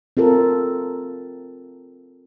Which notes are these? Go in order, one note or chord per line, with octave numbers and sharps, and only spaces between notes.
C4 F4 A4 A#4